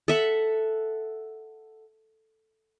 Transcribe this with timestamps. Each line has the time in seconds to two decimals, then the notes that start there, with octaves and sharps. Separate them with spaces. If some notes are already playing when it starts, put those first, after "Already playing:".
0.08 A4 E5 F#5